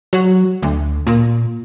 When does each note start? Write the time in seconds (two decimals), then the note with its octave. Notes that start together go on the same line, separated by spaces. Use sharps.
0.13 F#3
0.63 D2
1.07 A#2